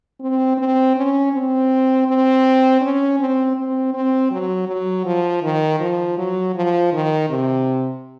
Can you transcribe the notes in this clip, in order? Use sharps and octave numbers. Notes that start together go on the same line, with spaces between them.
C4
C4
C#4
C4
C4
C#4
C4
C4
C4
F#3
F#3
F3
D#3
F3
F#3
F3
D#3
C3